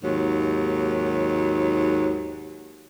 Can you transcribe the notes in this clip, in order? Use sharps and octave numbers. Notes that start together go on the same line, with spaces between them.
D#2 G#2 F#3